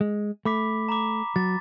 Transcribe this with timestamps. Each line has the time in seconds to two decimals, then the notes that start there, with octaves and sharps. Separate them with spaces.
0.01 G#3
0.45 A3 B5 D6 B6
0.89 A#5 B5 D6
1.36 F#3 A6